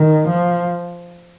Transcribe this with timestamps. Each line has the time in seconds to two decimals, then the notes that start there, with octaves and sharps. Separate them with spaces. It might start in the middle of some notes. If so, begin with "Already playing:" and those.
Already playing: D#3
0.28 F3